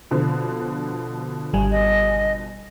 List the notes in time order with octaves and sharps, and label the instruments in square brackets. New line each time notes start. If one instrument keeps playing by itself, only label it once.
[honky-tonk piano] B2 D3 F3
[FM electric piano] G#1 G3 G#5
[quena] D#5